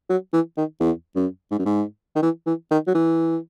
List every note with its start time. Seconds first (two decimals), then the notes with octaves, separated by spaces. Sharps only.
0.10 F#3
0.33 E3
0.57 D#3
0.80 E2
1.16 F#2
1.51 G#2
1.59 F#2
1.65 G#2
2.15 D#3
2.22 E3
2.46 E3
2.71 D#3
2.87 F#3
2.94 E3